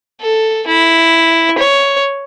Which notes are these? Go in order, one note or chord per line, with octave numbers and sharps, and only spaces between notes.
A4
E4
C#5